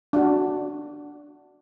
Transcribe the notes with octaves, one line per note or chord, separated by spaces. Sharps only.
D4 F#4